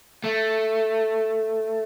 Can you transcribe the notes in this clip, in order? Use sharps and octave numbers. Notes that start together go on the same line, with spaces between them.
A3